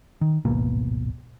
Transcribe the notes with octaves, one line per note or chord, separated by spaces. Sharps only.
D#3
D1 G#1 B2 A#3